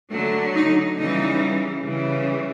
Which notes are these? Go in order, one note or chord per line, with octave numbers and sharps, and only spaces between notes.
D3 F#3 A3
D#4
C#3 E3 G3 D#4
C#3 E3 G3